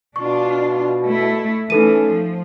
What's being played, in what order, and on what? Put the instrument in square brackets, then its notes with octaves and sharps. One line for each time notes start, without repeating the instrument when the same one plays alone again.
[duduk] B2 [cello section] D4 F4 [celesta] C#6
[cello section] A3 E4
[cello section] E3 A3 [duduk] C#4 [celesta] D#4 A4 D#7
[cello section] F3